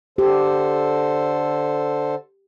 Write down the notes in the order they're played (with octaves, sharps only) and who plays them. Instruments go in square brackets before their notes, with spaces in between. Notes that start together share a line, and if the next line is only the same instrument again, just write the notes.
[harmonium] D3 A4 C5 [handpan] G4